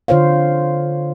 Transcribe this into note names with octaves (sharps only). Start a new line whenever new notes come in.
D3 F4 C5 C#5 F5